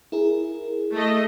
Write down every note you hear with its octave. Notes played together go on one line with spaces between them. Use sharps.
E4 G#4 A#4
A3 D#5